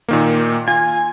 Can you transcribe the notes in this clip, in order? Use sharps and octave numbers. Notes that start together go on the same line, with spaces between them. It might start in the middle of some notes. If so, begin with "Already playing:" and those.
A#2 D#3 A#3
F4 G#5